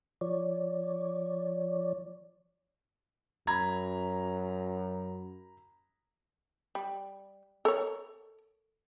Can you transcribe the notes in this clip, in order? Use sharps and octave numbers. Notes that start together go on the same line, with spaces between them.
F3 C#5 D5
F#2 A#5 B5 G#6
G3
A4 A#4 C#5